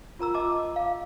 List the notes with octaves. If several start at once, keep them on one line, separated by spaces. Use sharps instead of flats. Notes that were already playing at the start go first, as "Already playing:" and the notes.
F4 A#4 A#5 E6
F4 D#5 A5 D6
F5